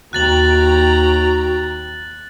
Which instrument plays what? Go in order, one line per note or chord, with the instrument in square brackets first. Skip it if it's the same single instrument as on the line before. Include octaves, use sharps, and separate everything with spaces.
[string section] D#2 G5 A#5 [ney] F#4 [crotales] F#6 A6 F#7